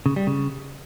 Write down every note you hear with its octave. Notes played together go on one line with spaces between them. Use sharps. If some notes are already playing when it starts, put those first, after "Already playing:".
C#3
G3
C#3